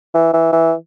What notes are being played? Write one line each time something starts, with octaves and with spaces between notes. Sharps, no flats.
E3
E3
E3